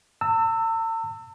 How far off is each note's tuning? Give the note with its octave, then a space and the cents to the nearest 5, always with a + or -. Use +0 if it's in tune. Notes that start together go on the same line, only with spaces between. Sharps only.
A5 +45 E6 +0